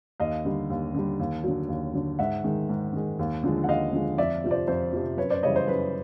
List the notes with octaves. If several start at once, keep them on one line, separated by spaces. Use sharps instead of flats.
D#2 D#5 F5
D3 G3
D#2
D3 G3
D#2
D3 F#3
D#2
D3 F#3
G#2 E5 F#5
D#3 G#3
G#2
D#3 G#3
D#2
D3 F3 G#3
F#5
D#2 D#5 F5
D3 F3 G#3
F2 D5 E5
C3 F3
C5 D5
F2 C5
C3 F3
F#2 B4 C#5
C5 D5
C#3 E3 G3 C#5 D#5
C5
F#2 B4